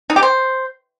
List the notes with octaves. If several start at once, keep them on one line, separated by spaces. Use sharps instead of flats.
D#4
G4
C5